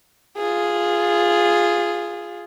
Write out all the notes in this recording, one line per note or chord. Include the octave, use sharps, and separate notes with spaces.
F4 G#4